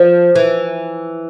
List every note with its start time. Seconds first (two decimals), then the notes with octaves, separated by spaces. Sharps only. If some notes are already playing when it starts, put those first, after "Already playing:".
Already playing: F3
0.35 E3